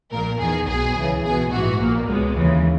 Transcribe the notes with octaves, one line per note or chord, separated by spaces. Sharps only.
A#1 A#2 A#4
E2 D#3 G#4
B1 B2 G#4
C#2 C#3 E3
B1 B2 G#4
A#1 G#2 E3 F#4
A#1 A#2 A#3
C#2 B2 G#3
D#2 C#3 E3